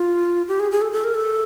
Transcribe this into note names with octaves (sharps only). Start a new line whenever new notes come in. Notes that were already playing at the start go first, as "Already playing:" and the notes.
Already playing: F4
G4
G#4
G#4
A4
A4
A#4
A4